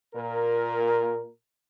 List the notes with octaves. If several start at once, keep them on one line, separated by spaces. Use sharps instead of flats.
A#2 A#4